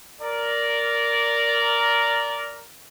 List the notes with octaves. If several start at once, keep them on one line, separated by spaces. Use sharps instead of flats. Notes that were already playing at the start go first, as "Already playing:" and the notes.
A#4 D5